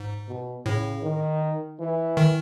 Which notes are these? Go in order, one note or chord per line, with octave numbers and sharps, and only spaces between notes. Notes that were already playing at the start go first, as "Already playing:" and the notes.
Already playing: G#2
B2
A2 C#3
D#3
E3
D#3